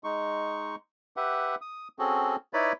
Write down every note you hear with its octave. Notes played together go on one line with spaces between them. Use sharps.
G#3 D#4 C#6
G4 B4 E5 F#5
D#6
C4 C#4 F#4 G#4 A4
D#4 E4 B4 C#5 D5 B5